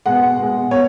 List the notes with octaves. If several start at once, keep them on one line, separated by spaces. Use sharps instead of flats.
B2 G#3 F#5
B2 G#3
B2 C#5